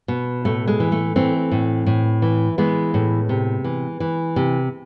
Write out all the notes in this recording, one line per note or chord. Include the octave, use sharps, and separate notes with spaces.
B2
A2 A3
G#3
E3
A3
E3 A3 C4
A2
A2
E3
E3 G#3 B3
A2
C3
E3
E3
C3